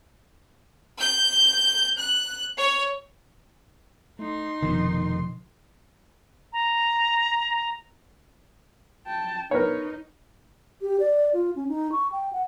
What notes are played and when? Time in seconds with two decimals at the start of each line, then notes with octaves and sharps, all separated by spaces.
1.00 G6
1.98 F#6
2.57 C#5
4.19 A3 D#4 C6
4.62 F1 B1 B2 D3 D#3 F3
6.53 A#5
9.06 G5 A5
9.51 D#4 A#4 B4 C#5
10.82 G4
11.00 D5
11.34 F4
11.56 C#4
11.68 D#4
11.92 C#6
12.12 G5
12.33 F#5